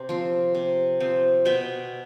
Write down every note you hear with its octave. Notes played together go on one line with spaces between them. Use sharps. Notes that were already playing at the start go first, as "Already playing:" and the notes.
Already playing: C3 C5
F3 C4
C3
F3 C4
B2 E5 G5